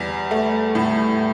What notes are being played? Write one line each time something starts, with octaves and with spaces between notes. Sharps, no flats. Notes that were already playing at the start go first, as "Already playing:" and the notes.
Already playing: E2 G3
A3
A2